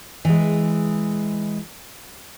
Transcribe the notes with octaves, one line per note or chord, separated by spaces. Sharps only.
E3 G#3